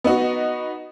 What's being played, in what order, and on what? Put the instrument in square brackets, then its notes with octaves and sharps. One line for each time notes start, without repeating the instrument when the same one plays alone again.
[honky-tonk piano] B3 D#4 F#4